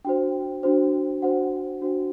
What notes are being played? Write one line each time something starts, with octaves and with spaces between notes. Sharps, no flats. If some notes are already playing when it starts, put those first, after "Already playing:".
D4 F#4 C5 G5
D4 F#4 C5
D4 F#4 C5 F#5
D4 F#4 C5